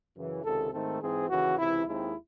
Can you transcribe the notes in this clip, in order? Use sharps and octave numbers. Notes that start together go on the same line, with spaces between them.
F#2 C#3 E3
C#2 C3 D#3 A4
G#2 D#3 A3 C4 A4
G#2 E3 C4 G#4
D#2 C#3 E3 F#4
C#2 C3 E3 E4
D#2 D#3 G#3 C4 E4